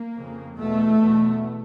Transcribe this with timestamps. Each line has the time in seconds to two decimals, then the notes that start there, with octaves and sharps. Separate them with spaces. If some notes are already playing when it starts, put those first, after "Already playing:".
Already playing: A#3
0.16 F2 C#3
0.58 E2 B2 A3
1.00 E2 B2